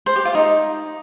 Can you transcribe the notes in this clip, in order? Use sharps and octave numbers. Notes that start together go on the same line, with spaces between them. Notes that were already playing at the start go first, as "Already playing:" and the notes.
C5
G4
F4
D#4